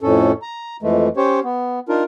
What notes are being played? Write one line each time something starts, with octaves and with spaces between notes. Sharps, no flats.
F2 A2 C#4 A4
A#5
F2 E3 G#3 A3
C#4 G4 C5 C#5
B3
D4 D#4 F4 A#4